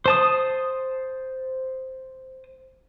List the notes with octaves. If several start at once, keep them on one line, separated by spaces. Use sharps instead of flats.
C5 A5 D#6